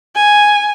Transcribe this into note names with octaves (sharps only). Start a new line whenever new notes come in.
G#5